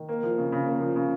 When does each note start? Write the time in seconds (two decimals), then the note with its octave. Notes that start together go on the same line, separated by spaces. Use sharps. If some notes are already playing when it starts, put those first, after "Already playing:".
Already playing: D#3
0.09 A#3
0.23 F3
0.38 C#3
0.52 C#3
0.66 A#3
0.81 F3
0.96 C#3